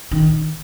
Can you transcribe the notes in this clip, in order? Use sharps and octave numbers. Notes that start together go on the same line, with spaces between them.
D#3